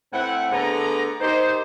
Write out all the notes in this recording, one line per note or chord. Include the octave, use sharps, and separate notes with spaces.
A2 C4 E4 F#5
D3 A3 B3 G#4 A#5
D#3 D#4 G4 C5